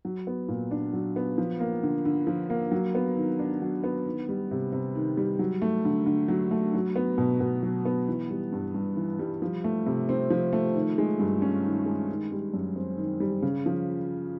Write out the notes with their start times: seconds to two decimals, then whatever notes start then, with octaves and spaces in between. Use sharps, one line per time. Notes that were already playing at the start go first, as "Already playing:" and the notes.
0.05 F#3
0.27 B3
0.48 A#2
0.71 D4
0.93 F#3
1.16 B3
1.38 F3
1.60 A#3
1.83 D3
2.05 D3
2.27 F3
2.50 A#3
2.71 F#3
2.95 B3
3.16 D#3
3.39 D4
3.62 F#3
3.84 B3
4.06 D#3
4.29 G3
4.51 C3
4.73 C3
4.95 D#3
5.17 G3
5.39 F#3
5.62 A3
5.85 D3
6.06 D3
6.28 F#3
6.51 A3
6.74 F#3
6.96 B3
7.18 B2
7.40 B2
7.63 F#3
7.85 B3
8.08 E3
8.30 G3
8.52 G2
8.74 G2
8.97 E3
9.19 G3
9.42 F3
9.64 A3
9.86 C3
10.09 C4
10.30 F3
10.53 A3
10.75 D#3
10.98 G#3
11.19 G2
11.42 C#4
11.64 D#3
11.86 G#3
12.09 D#3
12.32 G3
12.54 F#2
12.76 C4
12.98 D#3
13.20 G3
13.42 C#3
13.66 F3